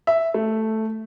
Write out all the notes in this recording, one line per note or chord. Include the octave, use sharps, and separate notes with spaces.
E5
A3